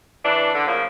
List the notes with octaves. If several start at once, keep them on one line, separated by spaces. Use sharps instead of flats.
C#3 E3 D4
D3
A2 C#3 F3 A#3